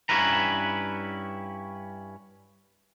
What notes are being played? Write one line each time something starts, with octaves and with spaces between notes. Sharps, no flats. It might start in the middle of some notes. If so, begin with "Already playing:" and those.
G2 C#4 E4 B4 A#5